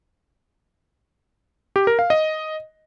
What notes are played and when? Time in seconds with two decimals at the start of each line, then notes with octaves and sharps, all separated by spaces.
1.76 G4
1.87 A#4
1.99 F5
2.10 D#5